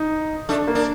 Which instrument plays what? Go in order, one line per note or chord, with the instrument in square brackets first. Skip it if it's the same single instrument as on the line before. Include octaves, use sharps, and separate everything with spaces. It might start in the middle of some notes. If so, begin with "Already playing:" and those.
Already playing: [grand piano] D#4
[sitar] A3 [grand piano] D4
[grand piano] A#3
[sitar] D4